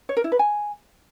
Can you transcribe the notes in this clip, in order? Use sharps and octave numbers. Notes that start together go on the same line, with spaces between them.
C#5
A#4
E4
B4
G#5